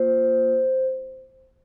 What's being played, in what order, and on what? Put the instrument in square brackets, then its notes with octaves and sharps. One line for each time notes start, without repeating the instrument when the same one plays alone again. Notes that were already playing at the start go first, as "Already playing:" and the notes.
Already playing: [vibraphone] A#3 F4 C5